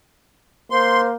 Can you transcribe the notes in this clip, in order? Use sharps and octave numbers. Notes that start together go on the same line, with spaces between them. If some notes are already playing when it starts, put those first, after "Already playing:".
A#3 C5 C6